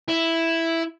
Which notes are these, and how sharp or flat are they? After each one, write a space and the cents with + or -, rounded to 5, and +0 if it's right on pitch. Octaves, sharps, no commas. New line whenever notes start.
E4 +0